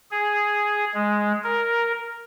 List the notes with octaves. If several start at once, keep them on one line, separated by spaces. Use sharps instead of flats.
G#4
G#3
A#4